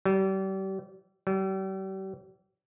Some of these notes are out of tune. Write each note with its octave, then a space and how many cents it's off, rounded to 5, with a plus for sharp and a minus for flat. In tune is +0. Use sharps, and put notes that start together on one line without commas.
G3 -35
G3 -40